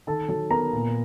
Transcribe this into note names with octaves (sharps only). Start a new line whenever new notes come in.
D#3 A4 A5
F#3 A4 A5
B3 A#4 A#5
A#2